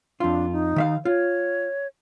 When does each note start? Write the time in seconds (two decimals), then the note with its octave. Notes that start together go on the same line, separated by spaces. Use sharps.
0.20 F2 D4 F4
0.52 D#4
0.76 D#3 E5 F5
1.05 F4 C#5